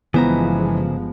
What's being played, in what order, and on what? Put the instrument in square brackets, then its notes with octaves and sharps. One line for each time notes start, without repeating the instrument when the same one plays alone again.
[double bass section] G1 F3 G#3 [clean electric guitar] C#3 C5 A#5 [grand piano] E3 [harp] B3